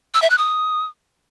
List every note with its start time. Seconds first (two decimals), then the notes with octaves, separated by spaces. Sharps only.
0.14 E6
0.22 E5
0.30 F#6
0.38 D#6